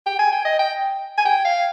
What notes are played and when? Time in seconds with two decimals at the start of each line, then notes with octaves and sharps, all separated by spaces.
0.06 G5
0.19 G#5
0.32 G5
0.45 D#5
0.59 G5
1.18 G#5
1.25 G5
1.45 F5